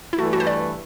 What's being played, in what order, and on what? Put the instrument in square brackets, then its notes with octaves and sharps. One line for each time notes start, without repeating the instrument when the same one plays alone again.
[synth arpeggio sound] E4
[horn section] G2 E3 A3 [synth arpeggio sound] F#4
[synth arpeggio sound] F#4
C5
D5